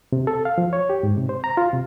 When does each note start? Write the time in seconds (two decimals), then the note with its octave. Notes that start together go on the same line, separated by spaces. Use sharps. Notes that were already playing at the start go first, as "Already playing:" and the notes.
0.12 C3
0.27 A4
0.45 F5
0.58 F3
0.73 C#5
0.90 G4
1.03 G#2
1.17 C3
1.29 C5
1.44 A#5
1.57 F4
1.73 C3